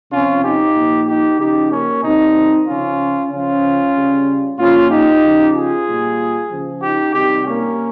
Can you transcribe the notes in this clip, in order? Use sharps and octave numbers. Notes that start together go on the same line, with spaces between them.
C3 F3 C#4 F4
D#4 G4
A#2 F3
D#4 G4
C#3 F3 D#4 G4
A#3 C#4
C3 D#3 G3 C4 D#4
C#3 F3 C#4 F4
C#3 F3 C#4 F4
C#3 G3
A#2 F3 C#4 F4
D#4 G4
C#3 F3
F4 G#4
A#2 G3
C#3 F3
D#4 G4
C3 D#3 G3 D#4 G4
A#3 C#4